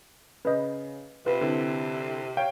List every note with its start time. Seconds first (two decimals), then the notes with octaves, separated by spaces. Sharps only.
0.45 C#3 B4 D#5
1.26 C3 F4 B4
1.41 D3 C4 E4
2.37 C#5 F5 G5